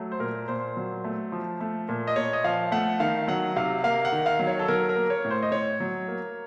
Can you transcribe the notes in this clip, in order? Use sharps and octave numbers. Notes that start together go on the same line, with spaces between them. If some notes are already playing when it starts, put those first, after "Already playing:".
Already playing: F#3 A3
C5
A#2 A#4
A#2 C5
F#3
A3
F3
A3
A#2
D#5
A#2 C#5
D#5
F3 F5
A3 F#5
D#3 F5
F#3 F#5
C3 F5
A#3 F5
F#5
D#3
F5
F#3
C#5
A4
F#3 A#4
A#4
A#3
C#5
A2
C5
D#5
A2 C#5
F#3
A#3